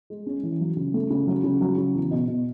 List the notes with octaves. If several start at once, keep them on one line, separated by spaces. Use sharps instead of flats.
G#3
C#4
E3
F#3
C#3
A3
C#3
F#3
C#3
F#3
C#3
E2
B2
B2